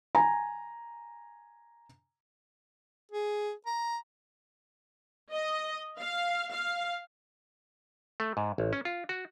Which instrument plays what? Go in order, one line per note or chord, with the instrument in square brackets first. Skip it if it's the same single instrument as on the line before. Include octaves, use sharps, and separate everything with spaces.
[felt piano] G#5 A#5
[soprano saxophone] G#4
A#5
[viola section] D#5
F5
F5
[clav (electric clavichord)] A3
G#2
A1
C#4
F4
F#4